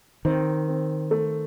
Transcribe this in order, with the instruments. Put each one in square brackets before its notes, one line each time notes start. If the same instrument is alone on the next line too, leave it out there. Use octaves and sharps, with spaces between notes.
[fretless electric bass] D#3 [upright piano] C4
[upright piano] C4
A3